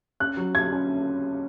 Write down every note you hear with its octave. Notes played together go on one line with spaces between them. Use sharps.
C#4 F#6
F#3
F#3 G#6
C#4